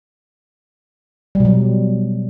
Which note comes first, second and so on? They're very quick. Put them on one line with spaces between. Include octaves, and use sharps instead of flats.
G3 B2 F#3